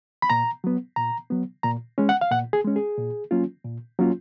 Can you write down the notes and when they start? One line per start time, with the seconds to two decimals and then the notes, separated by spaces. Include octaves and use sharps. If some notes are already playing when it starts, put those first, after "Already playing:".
0.22 B5
0.30 A#2 A#5
0.64 F#3 B3
0.96 A#2 A#5
1.30 F#3 B3
1.63 A#2 A#5
1.98 G#3 C#4
2.09 F#5
2.21 F5
2.31 A#2 F#5
2.53 G#4
2.64 G#3 C#4
2.76 G#4
2.98 A#2
3.31 F#3 A#3 C#4 F4
3.65 A#2
3.99 F#3 A#3 C#4 F4